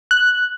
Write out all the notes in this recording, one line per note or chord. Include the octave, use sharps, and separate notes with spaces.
F#6